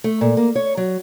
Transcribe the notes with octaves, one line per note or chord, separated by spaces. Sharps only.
A3
A#2
A#3
C#5
F#3